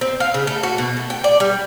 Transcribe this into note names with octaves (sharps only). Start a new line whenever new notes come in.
C4
F5
C#3
A3
F#4
B2
A3
G5
D5
G3